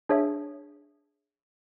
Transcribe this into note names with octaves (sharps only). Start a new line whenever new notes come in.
D4 G#4 C#5 E5